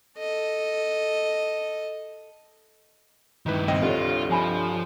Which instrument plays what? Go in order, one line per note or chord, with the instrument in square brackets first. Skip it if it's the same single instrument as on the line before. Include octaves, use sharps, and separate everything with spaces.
[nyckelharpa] A4 D#5
[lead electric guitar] G2 D#3 [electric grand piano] D#4 E4 B4
[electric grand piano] C2 C4 D#5 [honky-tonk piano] G5
[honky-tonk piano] G2 D3 C#5 [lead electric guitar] F4
[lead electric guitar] F3 [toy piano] D4 G#5 B5